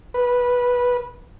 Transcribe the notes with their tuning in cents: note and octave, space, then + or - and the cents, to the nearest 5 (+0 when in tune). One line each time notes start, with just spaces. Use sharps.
B4 -15